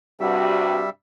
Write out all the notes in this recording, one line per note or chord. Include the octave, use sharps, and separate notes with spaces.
G2 C3 G3 F#4 E5